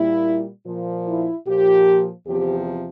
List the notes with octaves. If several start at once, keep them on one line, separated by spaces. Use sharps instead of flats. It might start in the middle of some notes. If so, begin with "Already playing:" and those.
Already playing: A#2 G3 E4
A#2 F3
E4
A#2 F3 G4
E2 C3 F3 G4